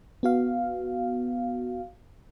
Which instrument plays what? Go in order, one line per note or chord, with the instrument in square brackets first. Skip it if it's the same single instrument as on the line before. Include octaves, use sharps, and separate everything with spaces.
[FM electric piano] B3 F#4 F5